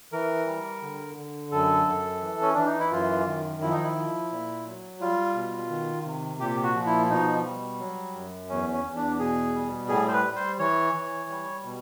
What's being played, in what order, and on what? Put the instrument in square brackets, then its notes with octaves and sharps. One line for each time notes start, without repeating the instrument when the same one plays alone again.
[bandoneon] E3 A#4
G3
D3
D3
F#2 A4
F#2
E3
C#4
E3 D4
D#4
E4
F#2 F4
D#3
F3 E4
D#4
E4
F3
A#2
F#3
G3 F4
B2
D#3
C3
A#2 G4
F#4
F3
E4
B2 D#4
G3
F#3
F#2
E2 C#4
C#4
E2
D4
B2 G#4
G3
A2 G#4
C5
B4
G3
C5
E3 C#5
E3
G3
B2